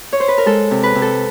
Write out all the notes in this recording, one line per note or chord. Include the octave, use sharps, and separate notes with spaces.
C#5
C5
B4
A#4
G#3 A4
C3
B4
C3
A4